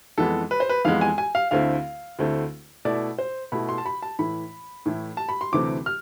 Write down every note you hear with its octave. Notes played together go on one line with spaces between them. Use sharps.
F2 E3 G#3 B3 A4
B4
C5
B4
F2 E3 G#3 B3 F5
G#5
G#5
F5
D2 D3 A3 C4 E4 F5
D2 D3 A3 C4 E4
B2 A3 E4 D5
C5
B2 A3 E4 B5
C6
A5
B5
A5
A2 E3 A3 E4 B5
A2 E3 A3 E4
A5
B5
C6
D2 C3 E3 A3 C4 D6
F6